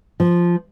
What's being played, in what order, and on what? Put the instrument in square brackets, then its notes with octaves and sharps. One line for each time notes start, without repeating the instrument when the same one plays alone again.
[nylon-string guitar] F3